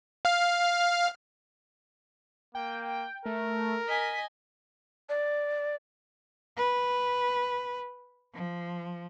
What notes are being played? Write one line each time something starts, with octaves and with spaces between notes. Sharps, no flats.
F5 F6
A#3 G5
A3 A#4
D#5 G#5 B6
D5
B4
F3